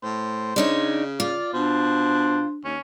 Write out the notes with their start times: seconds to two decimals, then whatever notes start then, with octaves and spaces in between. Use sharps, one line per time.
0.03 A2 C5
0.56 C#3 D4 D#4 C#5
1.20 F4 D5
1.53 B2 D4 C5
2.64 D#2 C#4